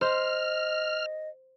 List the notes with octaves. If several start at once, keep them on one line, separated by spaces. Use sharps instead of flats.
C5 D#5 F6